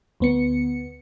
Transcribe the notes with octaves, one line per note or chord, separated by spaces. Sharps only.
D2 B3 C#7